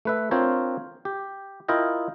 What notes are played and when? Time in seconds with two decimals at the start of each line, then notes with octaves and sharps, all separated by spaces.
0.05 A3 B4 E5
0.31 C4 D4 F4 A#4 C5 C#5
1.05 G4
1.68 E4 F4 A#4 D#5 G5